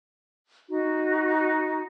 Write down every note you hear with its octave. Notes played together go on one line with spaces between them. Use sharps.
D#4 F#4